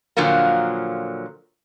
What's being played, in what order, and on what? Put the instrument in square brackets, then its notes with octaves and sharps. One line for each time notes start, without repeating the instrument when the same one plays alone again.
[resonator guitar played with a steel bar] A#2 D3 F3 F#3 A#3